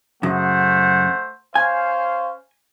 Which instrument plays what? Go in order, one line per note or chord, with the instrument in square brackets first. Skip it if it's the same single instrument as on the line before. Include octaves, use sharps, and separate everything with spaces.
[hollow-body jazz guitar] F#2 C#3 [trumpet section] A3 C5 F#5
[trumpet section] C#4 C5 F5 [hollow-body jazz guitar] G#5